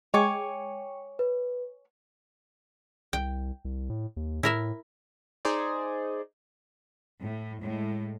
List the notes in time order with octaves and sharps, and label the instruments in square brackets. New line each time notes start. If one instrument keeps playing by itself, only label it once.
[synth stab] G#3 [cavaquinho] C#5 G#5 D6 [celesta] G5 C#6 C#7
[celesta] B4
[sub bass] C2 [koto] G5
[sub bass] C2
A2
D#2
[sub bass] A2 [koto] E4 A#4 E5
[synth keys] D#4 G#4 C5 D5
[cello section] A2
A2 G#3